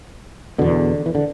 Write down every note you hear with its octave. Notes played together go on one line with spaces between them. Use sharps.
E2 B2 D3
E3
D3